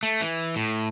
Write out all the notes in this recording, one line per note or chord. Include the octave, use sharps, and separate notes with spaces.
A3
E3
A2